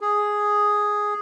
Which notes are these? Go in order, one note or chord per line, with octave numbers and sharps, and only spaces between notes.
G#4